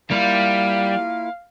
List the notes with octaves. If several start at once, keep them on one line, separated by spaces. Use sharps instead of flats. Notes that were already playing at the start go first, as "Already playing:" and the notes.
G3 A#3 E4 F4 F5